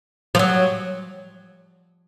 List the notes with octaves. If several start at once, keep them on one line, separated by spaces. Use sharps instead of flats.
F3
F#3